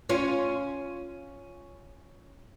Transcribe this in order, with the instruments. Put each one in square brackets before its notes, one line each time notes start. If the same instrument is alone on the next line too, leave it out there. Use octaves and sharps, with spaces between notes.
[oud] C#4 F4